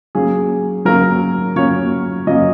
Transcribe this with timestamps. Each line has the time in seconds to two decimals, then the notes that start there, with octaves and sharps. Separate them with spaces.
0.15 F#3 A#3 C#4 G#4
0.85 F#3 A#3 C#4 A#4
1.56 F#3 A#3 C#4 C#5
2.27 F#3 A#3 C#4 D#5